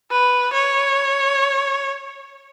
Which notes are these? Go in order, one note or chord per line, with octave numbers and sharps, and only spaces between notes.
B4
C#5